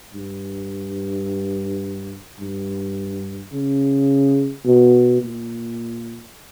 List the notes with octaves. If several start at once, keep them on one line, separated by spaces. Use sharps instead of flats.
G2
G2
C#3
B2
A#2